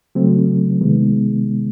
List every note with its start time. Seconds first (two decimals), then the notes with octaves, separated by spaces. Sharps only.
0.15 C#3 F#3 A3 C4
0.81 C3 D#3 G#3 B3